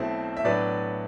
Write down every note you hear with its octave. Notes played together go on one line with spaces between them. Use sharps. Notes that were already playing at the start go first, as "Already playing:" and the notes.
Already playing: B1 B2 A3 C4 E4 C5 E5
E5
A2 F#3 B3 D4 B4 D5